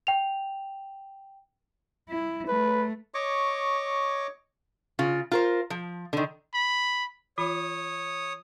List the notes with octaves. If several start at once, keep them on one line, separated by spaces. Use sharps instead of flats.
G5 F7
E4
A3 B4
C#5 D#5 C#6 D6
C#3 F4
F4 A#4 C5
F3
D3 D#3
B5
E3 F4 C#5 B5 D#6